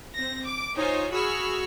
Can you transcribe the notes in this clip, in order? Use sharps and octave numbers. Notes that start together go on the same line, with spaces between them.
C4 A#6
D6
D#4 F4 C5 C#5 G#5
F#4 G#4 B5 C#6 E6 F6